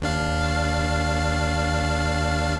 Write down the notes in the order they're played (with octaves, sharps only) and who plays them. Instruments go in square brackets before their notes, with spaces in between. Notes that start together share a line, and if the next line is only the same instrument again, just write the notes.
[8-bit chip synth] D#2 D4 F5